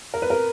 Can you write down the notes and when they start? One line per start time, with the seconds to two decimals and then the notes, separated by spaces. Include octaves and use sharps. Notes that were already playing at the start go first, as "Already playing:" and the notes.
0.14 A#4
0.22 B4
0.30 A#4